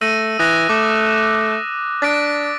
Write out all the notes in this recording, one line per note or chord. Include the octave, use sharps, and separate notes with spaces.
A3 E6 A#6 D#7
E3 D#6 F#6 A#6
A3 D6
D4 A6 B6 D7